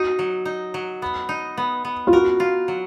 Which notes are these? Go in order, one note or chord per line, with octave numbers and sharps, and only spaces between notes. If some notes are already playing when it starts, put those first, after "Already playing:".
Already playing: D#4 F#4
F#3
D#4
F#3
B3
D#4
B3
B3
F4
F#4 A#4
F4
F#3